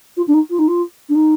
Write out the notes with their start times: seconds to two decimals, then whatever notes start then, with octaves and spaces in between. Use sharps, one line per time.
0.17 F4
0.27 D4
0.34 D#4
0.50 F4
0.59 D#4
0.68 F4
1.09 D4
1.15 D#4